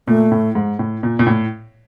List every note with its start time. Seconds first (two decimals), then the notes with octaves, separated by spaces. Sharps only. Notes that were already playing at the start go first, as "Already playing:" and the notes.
0.07 A#2 A3
0.31 A2
0.55 G#2
0.79 A2
1.03 A#2
1.19 A#2
1.27 A2